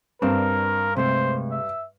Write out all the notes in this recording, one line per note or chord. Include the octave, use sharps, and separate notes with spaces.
G2 C4 D4 A#4
C3 G#3 A3 C5
E5